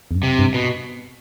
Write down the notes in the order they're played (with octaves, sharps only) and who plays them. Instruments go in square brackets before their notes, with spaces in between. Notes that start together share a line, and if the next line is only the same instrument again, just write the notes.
[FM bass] E2
F#2
[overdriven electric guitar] C3
[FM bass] G2
[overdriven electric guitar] B2